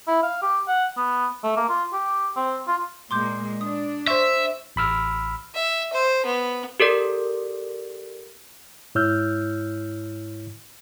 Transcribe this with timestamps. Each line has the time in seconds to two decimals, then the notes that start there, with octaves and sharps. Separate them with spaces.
0.07 E4
0.23 F5
0.42 G4
0.68 F#5
0.97 B3
1.44 A3
1.57 A#3
1.69 F4
1.93 G4
2.36 C4
2.68 F4
3.11 A#2 G#3 A#3 C6 D6 G6
3.61 D4 D#6
4.07 C5 E5 C6 C#6
4.76 A1 B5 E6 F6
5.55 E5
5.93 C5
6.26 B3
6.80 G4 A4 A#4 D5
8.95 G#2 E4 C#5 E6 F6 G6